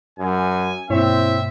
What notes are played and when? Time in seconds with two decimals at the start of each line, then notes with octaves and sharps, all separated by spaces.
0.19 F#2 G#5
0.90 G2 B2 A#3 C4 E4 C#5 E5